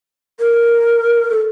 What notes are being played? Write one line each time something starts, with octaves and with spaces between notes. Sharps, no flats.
A#4
A4